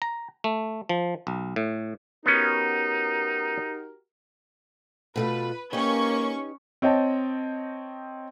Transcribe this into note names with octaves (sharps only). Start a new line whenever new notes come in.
A#5
A3
F3
B1
A2
B3 C#4 D#4 F#4 G4 A#4
B2 A3 F4 B4
A#3 C#4 D#4 G4 B4 C#6
C4 C#5 D#5 G5 A5